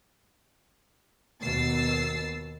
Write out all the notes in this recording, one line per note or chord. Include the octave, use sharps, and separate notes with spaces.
D#2 B2 E6 A6 C7